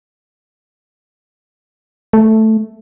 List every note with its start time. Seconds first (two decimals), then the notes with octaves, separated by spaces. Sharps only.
2.13 A3